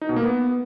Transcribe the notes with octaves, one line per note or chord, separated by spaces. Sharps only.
D#4
B2
A#3
B3